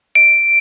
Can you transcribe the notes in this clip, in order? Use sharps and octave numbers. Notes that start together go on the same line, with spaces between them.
D7